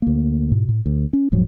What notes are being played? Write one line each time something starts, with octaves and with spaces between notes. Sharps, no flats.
D2 A#3
G#2 B2
A2
D2
C#4
D#1 G#2 F3 F#3